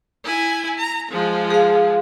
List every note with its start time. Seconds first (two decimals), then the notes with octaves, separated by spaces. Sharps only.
0.24 E4 G#5
0.79 A#5
1.11 F3 G#3
1.50 G#4 F5